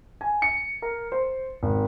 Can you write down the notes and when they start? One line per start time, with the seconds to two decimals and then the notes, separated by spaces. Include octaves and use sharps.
0.21 G#5
0.42 C#7
0.82 A#4
1.12 C5
1.63 G#1